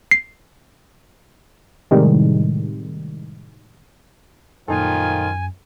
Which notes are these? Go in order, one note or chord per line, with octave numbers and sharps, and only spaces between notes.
C7
A2 C3 D#3 G3 G#3
F#2 A#2 D#3 F3 D#4 F4 A4 G#5